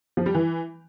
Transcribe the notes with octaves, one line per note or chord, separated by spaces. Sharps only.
F3
G3
E3